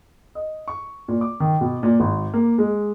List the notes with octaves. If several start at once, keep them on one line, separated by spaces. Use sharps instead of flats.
D#5
C#6
A#2
D6
D#3
B2
A#2
G#1
A#3
G#3